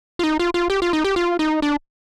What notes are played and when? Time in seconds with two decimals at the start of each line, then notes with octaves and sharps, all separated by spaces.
0.19 F4
0.24 D#4
0.39 F4
0.54 F4
0.70 G4
0.82 F4
0.93 D#4
1.04 G4
1.16 F4
1.39 D#4
1.62 D4